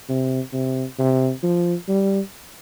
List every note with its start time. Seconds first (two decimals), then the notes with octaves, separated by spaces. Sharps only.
0.09 C3
0.53 C3
0.99 C3
1.43 F3
1.89 G3